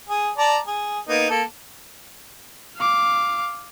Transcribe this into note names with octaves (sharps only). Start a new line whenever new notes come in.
G#4
D5 A5 A#5
G#4
A#3 B3 D#4
A#3 A4
F5 D6